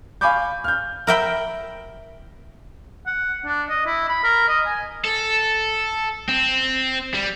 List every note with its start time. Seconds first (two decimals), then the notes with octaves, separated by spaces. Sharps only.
0.21 F5 G#5 B5 C#6 D6 G6
0.64 F6 G6
1.07 A#4 E5 G5 B5
3.07 F#5
3.46 D4
3.70 D#5
3.86 E4
4.09 B5
4.24 A#4
4.48 D#5
4.66 G#5
5.05 A4
6.29 C4
7.14 G3